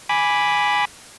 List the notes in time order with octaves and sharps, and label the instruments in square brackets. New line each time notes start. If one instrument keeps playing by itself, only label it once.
[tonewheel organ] G#5 B5 D6